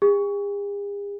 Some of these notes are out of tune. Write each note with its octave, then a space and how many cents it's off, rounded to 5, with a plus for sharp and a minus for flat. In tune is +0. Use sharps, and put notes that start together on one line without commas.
G#4 -45